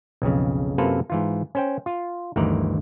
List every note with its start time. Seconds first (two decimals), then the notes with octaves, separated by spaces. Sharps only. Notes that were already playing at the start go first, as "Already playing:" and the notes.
0.22 B1 F2 C#3
0.78 F#2 C3 A#3 F4 A4 B4
1.10 G#2 E3 F4
1.55 C#4 C5 G5
1.86 F4
2.36 G1 D2 D#3 E3 D5 A#5